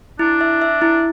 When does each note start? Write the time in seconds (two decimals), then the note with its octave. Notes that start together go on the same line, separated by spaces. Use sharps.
0.19 D4 E4
0.41 E5
0.62 E5
0.82 E4